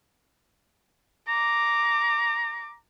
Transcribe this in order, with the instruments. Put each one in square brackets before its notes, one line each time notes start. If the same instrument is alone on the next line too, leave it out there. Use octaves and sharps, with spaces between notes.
[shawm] A#5 [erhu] D6